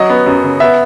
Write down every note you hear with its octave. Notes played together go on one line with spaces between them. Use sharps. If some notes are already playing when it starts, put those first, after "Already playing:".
Already playing: F#3 D#5
B3
F#2
C#3
B3 E5